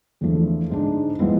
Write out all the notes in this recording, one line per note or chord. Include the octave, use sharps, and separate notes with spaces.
E2 D3 F3 A3
G#2 G#3 D4
F3 G#3 B3 E4